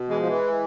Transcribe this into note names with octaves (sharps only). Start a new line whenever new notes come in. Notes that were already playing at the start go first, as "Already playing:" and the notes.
Already playing: B2
E3 G#3
F3
E3
G#3